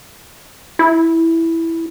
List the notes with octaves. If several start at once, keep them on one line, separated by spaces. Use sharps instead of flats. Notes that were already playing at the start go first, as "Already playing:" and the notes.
E4